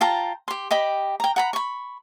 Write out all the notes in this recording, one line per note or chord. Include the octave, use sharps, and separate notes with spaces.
F4 G5 A5 A#5
G4 C6
G4 D#5 G5 B5
G5 A#5
F#5 A#5 B5
B5 C#6